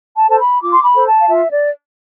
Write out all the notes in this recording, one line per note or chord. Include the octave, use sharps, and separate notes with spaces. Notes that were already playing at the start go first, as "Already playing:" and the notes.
A5
A4 C5 A5
B5
F4 D6
C6
B5
A4 C5
A5
F5
F4 E5
D5